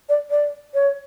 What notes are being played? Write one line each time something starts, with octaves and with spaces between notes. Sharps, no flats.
D5
D5
C#5